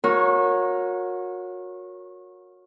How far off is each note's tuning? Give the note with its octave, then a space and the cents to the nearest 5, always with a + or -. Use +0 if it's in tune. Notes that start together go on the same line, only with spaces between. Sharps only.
F#4 -30 A#4 +0 C#5 +0